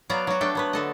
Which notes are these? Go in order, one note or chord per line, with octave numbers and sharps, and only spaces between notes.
F#3 B3 D5 F5 A#5
F#3 F#4
A3 D4 A4 G5
F#3 B3 B4
D3 A4 D#5